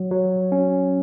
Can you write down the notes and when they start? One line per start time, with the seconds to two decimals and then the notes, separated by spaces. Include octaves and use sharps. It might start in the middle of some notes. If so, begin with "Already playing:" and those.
Already playing: F#3
0.11 F#3
0.52 C#4